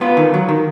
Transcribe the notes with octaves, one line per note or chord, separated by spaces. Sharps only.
B3 F4
D#3
F#3
D#3